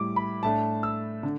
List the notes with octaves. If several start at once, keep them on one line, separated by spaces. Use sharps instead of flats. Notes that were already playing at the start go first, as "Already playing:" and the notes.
Already playing: A2 G3 E4 D6
B5
A2 A3 D4 A5
E6
D3